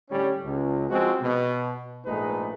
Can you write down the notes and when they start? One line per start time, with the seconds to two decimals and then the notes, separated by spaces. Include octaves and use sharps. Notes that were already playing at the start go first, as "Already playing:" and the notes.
0.10 A2 D3 G3 C#4
0.44 C#2
0.90 F3 G#3 C4 F#4
1.22 B2
2.06 A#1 G#2 G#3 A3 D#4 B4